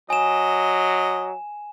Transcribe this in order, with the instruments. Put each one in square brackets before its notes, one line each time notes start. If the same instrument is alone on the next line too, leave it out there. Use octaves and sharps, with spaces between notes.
[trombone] F#3 [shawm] D#5 [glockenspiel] G#5 E7